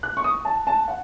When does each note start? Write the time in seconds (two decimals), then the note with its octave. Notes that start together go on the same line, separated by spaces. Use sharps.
0.03 F#6
0.17 C#6
0.24 D#6
0.45 A5
0.67 A5
0.88 F#5